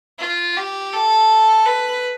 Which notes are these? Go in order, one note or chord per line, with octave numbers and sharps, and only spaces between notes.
F4
G4
A4
B4